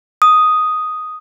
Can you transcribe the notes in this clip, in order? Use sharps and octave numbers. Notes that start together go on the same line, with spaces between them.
D#6